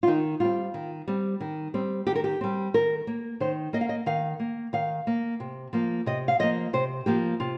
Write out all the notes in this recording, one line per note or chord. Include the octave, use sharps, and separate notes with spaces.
F4
D#3 D#4
G3 C4 F4
D#3
G3 C4
D#3
G3 C4
D#3 G4
A#4
G4
G3 C4
D#3 A#4
A#3
D#3 C5
A#3 D#5
F5
D#5
D#3 F5
A#3
D#3 F5
A#3
C3
F3 A#3
C3 D#5
F5
F3 A#3 D#5
C3 C5
F3 A#3 G4
C3 F4